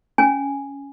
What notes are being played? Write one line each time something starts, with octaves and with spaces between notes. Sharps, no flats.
C#4 G#5